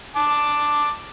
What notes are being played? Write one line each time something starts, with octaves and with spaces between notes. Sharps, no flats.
A5 D6